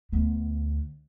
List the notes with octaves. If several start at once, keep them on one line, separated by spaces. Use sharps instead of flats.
D2 B3